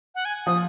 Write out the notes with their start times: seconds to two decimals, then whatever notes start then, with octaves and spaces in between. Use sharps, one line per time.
0.15 F#5
0.25 G#5
0.47 F3 D#6